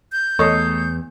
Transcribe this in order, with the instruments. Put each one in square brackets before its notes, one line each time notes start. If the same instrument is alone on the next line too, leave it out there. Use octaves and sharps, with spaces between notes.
[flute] G6
[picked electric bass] E2 [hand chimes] A3 D#6 C7 [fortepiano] A4 C#5 D#5